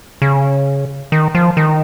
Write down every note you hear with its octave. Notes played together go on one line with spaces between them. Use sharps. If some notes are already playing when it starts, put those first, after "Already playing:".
C#3
D#3
F3
D#3